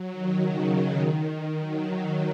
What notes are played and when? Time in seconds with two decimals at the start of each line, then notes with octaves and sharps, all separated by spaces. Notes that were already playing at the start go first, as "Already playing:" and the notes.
Already playing: F#3
0.12 D#3
0.42 C#3
0.70 D#3
1.58 F#3